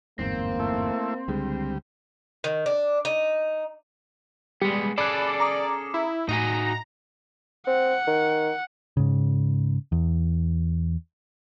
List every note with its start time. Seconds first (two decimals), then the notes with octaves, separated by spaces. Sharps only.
0.19 G1 E2 G#2 A#3 C4
0.59 A3 E4
1.28 C#2 D3 G3 G#3
2.44 D#3
2.66 D4
3.05 D#4
4.61 G3 G#3 B3
4.98 C#4 G#4 A4 D5 B5 F#6
5.40 A#5 D6 D#6
5.94 E4
6.29 A2 D#4 F#4 G#5 A#5
7.67 C4 F#5
8.07 D#3
8.97 G#2 C#3
9.92 E2